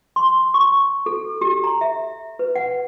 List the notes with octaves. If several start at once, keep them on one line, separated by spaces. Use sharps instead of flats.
C6
C#6
A4
G4
A#5
E5
B4
F#5